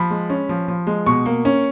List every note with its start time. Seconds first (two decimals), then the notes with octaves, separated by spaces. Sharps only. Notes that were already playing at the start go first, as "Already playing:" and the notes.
Already playing: F3 B5
0.11 G#3
0.30 C#4
0.49 F3
0.68 F3
0.87 G#3
1.06 B2 C#6
1.26 A#3
1.45 C#4